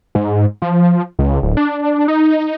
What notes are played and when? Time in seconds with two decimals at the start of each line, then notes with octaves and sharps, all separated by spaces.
0.15 G#2
0.62 F3
1.19 C#2
1.43 D1
1.57 D4
2.08 D#4